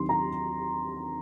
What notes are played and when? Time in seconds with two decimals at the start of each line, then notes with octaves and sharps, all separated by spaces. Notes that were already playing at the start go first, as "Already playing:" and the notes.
Already playing: D#2 D#3 F#3 C4 C6
0.09 A#5